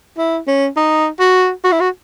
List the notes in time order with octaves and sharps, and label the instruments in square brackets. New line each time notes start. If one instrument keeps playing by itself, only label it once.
[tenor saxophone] E4
C#4
D#4
F#4
F#4
E4
F#4